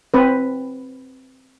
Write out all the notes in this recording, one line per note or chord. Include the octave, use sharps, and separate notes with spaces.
C4 B4